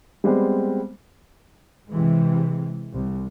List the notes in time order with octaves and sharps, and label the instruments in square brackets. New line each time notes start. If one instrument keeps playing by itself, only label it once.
[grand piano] G3 G#3 B3 C4
[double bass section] C3 E3 G#3
C2